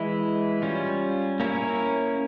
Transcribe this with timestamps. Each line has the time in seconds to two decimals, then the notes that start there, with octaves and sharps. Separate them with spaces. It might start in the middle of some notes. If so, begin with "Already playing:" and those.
Already playing: E3 G#3 E4
0.62 G3 C#4 F4
1.40 A#3 C#4 E4 A#4 C#5